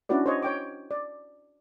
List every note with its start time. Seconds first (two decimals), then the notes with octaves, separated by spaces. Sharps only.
0.09 C#4 D4 E4 F#4 B4 D5
0.26 C5 C#5 D#5
0.42 C#5 G5 D6
0.91 D5